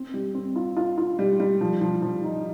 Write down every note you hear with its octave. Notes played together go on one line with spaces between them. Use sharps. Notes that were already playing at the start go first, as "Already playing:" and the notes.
Already playing: C4
G3
C4
F4
F4
F4
G3
G3
F3
F3
F3
D#4